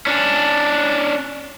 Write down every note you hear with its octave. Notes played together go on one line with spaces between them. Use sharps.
C#4 D4